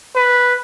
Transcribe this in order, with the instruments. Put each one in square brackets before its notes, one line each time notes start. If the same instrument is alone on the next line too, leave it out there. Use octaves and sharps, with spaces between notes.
[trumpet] B4